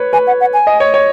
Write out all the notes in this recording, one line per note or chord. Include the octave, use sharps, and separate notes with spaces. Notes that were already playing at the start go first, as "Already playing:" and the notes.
Already playing: B4 C#5
B4 G#5
F#5
F#5
G#5
D#5
C#5
C#5